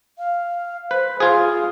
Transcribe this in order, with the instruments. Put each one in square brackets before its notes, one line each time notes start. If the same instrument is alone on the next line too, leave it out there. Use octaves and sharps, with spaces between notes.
[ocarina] F5
[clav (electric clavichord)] B4 [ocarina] C5
[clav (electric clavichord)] F4 G#4 [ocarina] F5